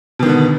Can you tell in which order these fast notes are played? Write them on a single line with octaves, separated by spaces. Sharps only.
B2 D#3 D3 B3